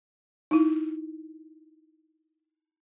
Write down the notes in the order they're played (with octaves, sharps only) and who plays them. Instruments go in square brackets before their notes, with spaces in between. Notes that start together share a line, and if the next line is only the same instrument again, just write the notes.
[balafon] D#4 E4